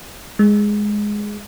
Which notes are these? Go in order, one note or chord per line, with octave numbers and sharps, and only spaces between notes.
G#3